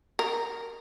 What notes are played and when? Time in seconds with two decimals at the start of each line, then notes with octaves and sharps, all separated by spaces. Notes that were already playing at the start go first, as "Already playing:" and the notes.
0.19 A#4